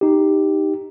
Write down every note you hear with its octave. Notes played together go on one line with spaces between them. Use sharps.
D#4 G4